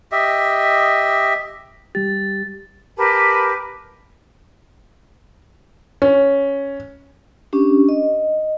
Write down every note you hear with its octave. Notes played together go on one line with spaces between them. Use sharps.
G4 D#5 E5
G3 G4 A6
G4 A#4 B4 A5
C#4
C#4 D4 G4
D#5